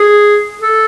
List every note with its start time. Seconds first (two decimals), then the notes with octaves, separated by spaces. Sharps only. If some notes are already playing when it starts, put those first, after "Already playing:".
Already playing: G#4
0.61 A4